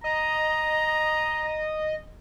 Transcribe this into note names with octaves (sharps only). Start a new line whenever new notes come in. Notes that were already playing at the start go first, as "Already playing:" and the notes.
D#5 A#5